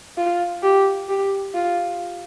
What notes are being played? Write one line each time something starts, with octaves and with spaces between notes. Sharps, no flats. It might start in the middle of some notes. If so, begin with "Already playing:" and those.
F4
G4
G4
F4